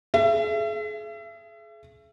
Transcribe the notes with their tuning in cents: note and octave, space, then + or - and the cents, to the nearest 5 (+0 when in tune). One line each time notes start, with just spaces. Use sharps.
G#4 +35 E5 +35